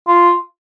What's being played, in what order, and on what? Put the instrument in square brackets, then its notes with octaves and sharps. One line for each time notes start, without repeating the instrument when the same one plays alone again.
[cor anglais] F4